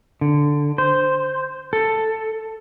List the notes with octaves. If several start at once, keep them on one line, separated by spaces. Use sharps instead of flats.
D3
C5
A4